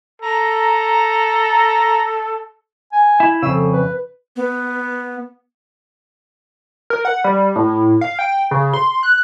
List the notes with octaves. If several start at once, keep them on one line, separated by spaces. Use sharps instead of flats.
A4 A#5
G#5
E4
F2 C#3 E6
A4
B4
B3
A#4
F#5
G3
A2
F5
G5
C#3
C6
F#6